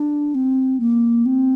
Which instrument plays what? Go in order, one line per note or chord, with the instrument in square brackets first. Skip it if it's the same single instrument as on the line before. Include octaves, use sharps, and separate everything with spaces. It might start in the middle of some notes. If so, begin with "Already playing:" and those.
Already playing: [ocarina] D4
C4
A#3
C4